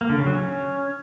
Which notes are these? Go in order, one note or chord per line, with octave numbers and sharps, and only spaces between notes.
A#3
D3
C#3
F#3
C#4